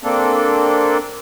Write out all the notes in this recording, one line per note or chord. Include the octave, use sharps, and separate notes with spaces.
A#3 C4 D4 A4